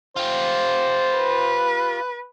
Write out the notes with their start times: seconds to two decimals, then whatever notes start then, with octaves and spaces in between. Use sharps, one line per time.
0.16 F4 G4 C5
1.15 B4